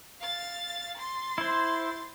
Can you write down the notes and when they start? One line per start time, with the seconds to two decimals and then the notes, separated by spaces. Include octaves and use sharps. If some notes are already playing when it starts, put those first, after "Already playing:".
0.21 F5 A6
0.97 C6 A6
1.38 E4 C5